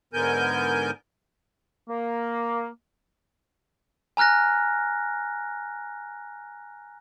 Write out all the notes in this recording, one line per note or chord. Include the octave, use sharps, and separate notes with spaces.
G#2 D3 B3 A#4 G#5 G6
A#3
G#5 A#5 F6 F#6 A#6